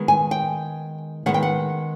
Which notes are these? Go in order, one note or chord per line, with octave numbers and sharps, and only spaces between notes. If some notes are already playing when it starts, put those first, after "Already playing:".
Already playing: D#3 G#3 B3
G#5
G5
D#3 G#3 B3 F#5
G5
F#5